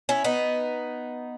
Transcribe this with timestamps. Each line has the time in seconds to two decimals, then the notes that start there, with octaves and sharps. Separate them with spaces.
0.09 C#4 E4
0.24 B3 D#4